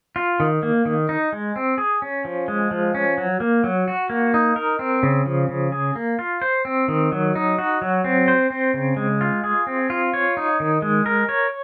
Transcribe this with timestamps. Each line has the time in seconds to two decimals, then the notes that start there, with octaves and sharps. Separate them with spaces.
0.16 F4
0.40 D#3
0.63 A#3
0.85 D#3
1.09 D#4
1.33 G#3
1.56 C4
1.78 G#4
2.02 C#4
2.25 F3
2.48 G#3
2.71 F3
2.95 C#4
3.18 F#3
3.40 A#3
3.64 F#3
3.88 F#4
4.10 A#3
4.34 D#4
4.56 A#4
4.79 C4
5.03 C#3
5.26 F3
5.49 C#3
5.72 G#4
5.96 A#3
6.19 F4
6.42 C5
6.65 C4
6.88 D#3
7.12 F#3
7.35 D#4
7.58 F#4
7.82 F#3
8.04 C4
8.28 C5
8.50 C4
8.74 C#3
8.97 G#3
9.21 F4
9.44 G#4
9.67 C4
9.90 F4
10.14 C#5
10.37 D#4
10.60 D#3
10.82 G#3
11.06 A#4
11.29 C#5